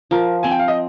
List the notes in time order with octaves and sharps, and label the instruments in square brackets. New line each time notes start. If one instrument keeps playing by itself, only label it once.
[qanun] F3 [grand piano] A#4
[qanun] C4 [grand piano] G#5
[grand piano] G5
F5
D#5